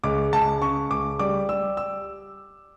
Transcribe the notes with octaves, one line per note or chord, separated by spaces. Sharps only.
C#2 D6
C#2 A5
C#3 C#6
C#2 D6
G3 D6
G3 E6
E6